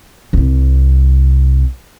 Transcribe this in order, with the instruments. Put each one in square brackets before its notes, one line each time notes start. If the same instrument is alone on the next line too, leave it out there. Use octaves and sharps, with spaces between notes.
[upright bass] C2 C3